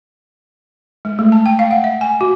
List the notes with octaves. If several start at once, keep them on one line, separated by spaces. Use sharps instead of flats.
G#3
A3
A5
G5
F5
F#5
E5
G#5
F#4